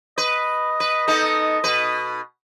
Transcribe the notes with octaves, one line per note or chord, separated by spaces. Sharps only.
B4 D#5
B4
B3 D#4 A4
B2 B4